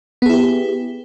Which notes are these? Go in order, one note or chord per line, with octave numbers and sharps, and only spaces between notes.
B3 E4 G4 G#4